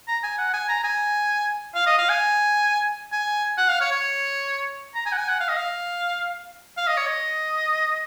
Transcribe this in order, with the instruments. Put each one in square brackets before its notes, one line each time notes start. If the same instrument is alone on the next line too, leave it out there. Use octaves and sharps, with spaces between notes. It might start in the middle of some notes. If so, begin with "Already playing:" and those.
[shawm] A#5
G#5
F#5
G#5
A#5
G#5
F5
D#5
F5
G#5
G#5
F#5
F5
C#5
C#5
A#5
G#5
F#5
G#5
F#5
F5
D#5
F5
F5
D#5
C#5
D#5